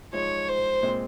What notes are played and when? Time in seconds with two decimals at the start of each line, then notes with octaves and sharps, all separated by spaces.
0.13 F3 G#3 D#4 C#5
0.49 C5
0.83 A#2 G#3 C4